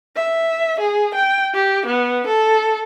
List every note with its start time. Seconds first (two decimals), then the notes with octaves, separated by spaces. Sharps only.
0.16 E5
0.80 G#4
1.15 G5
1.54 G4
1.86 B3
2.27 A4